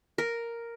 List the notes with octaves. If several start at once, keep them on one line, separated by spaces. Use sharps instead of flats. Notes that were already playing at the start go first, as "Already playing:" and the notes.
A#4